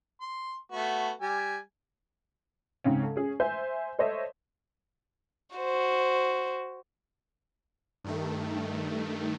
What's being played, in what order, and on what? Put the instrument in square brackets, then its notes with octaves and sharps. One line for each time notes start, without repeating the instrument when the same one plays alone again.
[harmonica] C6
A3 B3 F#4
G3 G#5
[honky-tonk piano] G#2 C#3 C4 C#4
A4
C#4 G#4
C5 E5 G#5 G6
A4 C5 C#5 D#5 E5
[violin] F#4 C5
[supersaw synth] G2 D#3 A3